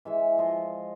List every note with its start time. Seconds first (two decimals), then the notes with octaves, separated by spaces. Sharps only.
0.05 E3 G#3 E5
0.38 F3 D#5 C6